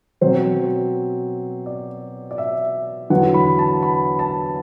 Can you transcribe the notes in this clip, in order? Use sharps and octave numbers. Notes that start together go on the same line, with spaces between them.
B2 F#3 C4 C5
D5
D5
E5
E2 D3 F#3 B3 F#5
B5
A5
B5
A5